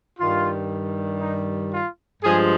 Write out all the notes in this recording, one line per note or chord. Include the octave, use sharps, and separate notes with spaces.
G2 D#3 G3 F4
D#4
F4
G2 F3 G#3 G#4